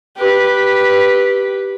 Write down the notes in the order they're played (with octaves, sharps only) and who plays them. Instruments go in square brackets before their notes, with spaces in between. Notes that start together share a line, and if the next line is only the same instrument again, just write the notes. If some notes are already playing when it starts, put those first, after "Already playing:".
[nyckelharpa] G4 B4